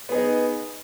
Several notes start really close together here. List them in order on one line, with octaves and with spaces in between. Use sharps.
B3 G#4 D#4